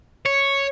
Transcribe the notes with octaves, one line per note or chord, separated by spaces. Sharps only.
C#5